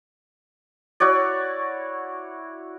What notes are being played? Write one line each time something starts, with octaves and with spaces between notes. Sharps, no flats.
E4 F#4 C#5 D5